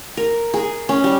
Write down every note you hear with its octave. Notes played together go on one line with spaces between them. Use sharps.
A#4
G#4
C#4
G3